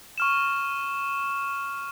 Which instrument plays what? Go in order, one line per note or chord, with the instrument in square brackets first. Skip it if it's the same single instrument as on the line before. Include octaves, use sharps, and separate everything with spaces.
[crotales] C#6 F6 E7